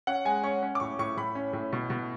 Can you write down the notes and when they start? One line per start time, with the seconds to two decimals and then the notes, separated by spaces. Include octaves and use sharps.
0.07 C#4 F#5
0.25 G#3 G#5
0.43 C#4 C#6
0.62 C#4
0.75 D6
0.80 A2 C#6
0.99 A2 C#6
1.17 A2 B5
1.35 C#4
1.53 A2
1.73 B2
1.90 B2